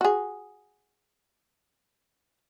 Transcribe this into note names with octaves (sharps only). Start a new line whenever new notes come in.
F#4 G#4